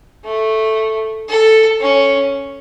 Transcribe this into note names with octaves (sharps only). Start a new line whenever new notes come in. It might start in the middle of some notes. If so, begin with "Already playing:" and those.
A3
A4
C#4